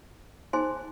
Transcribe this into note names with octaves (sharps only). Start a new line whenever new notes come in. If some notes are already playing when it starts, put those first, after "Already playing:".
D#4 G#4 C5 G#5 C6